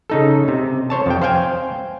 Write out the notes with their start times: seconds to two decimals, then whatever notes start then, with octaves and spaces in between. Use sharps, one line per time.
0.10 C#3 D#4 A4
0.48 C3
0.90 C5 C#5 A5
1.06 F2 G5
1.22 C5 F5 G5 G#5